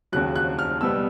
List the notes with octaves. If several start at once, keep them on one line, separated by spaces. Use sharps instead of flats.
D#2 C#3 F#3 F#6
F#6
F6
B2 G3 B3 E6